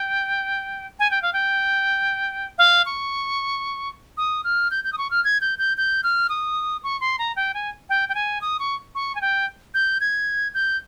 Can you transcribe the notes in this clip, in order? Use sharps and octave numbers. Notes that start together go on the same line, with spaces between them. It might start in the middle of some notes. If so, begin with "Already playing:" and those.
Already playing: G5
G#5
G5
F5
G5
F5
C#6
D#6
F6
G6
G6
D#6
C#6
F6
G#6
G6
G6
G6
F6
D#6
C#6
C6
A#5
G5
G#5
G5
G5
G#5
D#6
C#6
C#6
G#5
G5
G6
G#6
G6